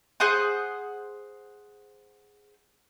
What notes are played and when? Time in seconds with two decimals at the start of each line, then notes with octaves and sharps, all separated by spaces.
0.20 G#4 C5 F#5 D#6